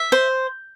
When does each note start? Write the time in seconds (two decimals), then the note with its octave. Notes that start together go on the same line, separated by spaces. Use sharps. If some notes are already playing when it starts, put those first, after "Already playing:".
Already playing: E5
0.12 C5